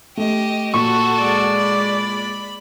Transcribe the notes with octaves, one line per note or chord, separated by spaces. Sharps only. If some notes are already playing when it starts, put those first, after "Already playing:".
A3 G4 D#5
A#2 F#4 A4 C#6
G#3 D5
B5